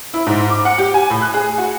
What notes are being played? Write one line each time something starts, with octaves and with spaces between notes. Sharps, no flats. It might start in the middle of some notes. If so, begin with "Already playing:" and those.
E4
G#2
D6
F#5
G4
G#5
A2
F#6
G#4
F#4